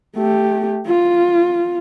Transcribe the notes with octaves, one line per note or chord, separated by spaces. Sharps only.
A3 G4
F4